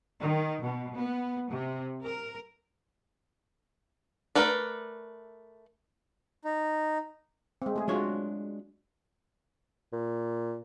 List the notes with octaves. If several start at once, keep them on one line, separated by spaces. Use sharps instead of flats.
D#3
B2
B3
C3
A#4
A3 A#4 B4 D5
D#4
G#3 C4
A3 G#4
F#3 G#3 D4 F4 F#4 C#5
A#2